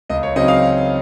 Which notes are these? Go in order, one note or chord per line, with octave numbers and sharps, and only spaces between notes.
C#2 D#5
C#5
C#3 F#3 C4 D#4 D#5
F5